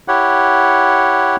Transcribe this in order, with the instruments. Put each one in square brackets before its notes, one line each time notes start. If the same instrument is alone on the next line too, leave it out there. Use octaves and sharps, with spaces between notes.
[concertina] E4 G4 C#5 F#5